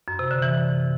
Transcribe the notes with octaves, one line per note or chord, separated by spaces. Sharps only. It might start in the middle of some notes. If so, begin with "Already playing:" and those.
F#2
C3
D3
E3